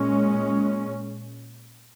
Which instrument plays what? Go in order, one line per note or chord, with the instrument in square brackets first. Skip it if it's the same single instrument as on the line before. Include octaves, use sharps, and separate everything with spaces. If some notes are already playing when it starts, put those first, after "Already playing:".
Already playing: [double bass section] A#2 G#3 C#4